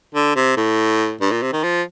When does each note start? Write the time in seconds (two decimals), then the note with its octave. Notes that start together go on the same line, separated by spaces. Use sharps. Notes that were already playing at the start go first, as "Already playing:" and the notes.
0.15 D3
0.36 C3
0.57 A2
1.21 G2
1.32 A#2
1.42 C3
1.53 D#3
1.63 F3